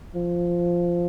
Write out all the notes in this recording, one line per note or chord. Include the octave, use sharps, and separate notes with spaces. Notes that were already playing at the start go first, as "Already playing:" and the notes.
F3